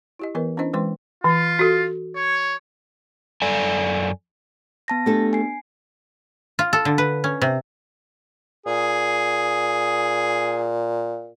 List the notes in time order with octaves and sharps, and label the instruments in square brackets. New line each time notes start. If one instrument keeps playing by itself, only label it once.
[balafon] E4 G4 D#5
E3 B3 A#4 B4 D#5
C#4 D4 E4 C5 D#5
E3 G#3 B4 C5 G5 C6
[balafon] E3 [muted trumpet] F4
[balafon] F#4 A4
[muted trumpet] C#5
[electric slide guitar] F#2 A4 D5 G#5
[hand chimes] B3 A5 A#6
[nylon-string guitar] A3 G4 A4 [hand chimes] B3 D4
[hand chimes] G#5 C7
[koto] F4
A4
D3
B4
C#4
C3
[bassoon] A#2 [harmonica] G#4